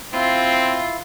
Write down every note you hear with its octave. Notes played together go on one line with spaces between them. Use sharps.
C4 E4 F4